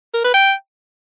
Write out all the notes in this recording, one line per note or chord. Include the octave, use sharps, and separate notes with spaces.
A#4
B4
G5